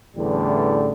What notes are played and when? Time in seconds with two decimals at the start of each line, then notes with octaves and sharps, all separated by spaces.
0.17 A1 E2 A2 D3 E3 G3